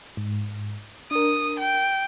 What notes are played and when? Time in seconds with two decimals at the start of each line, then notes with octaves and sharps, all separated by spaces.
0.17 G#2
1.11 D4 A#4 D#6
1.58 G5